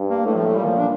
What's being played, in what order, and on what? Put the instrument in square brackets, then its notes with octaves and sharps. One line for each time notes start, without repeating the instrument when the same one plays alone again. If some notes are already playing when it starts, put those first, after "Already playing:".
Already playing: [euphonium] G2
[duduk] A#3
[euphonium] A2 [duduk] A3
[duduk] F3
A3
[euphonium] A#2 [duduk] G3
[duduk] D#3
F3
D4